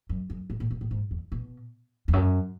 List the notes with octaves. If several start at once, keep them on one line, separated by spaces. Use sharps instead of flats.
F#2
F#2
G#2
A2
B2
A2
G#2
E2
B2
E2
F#2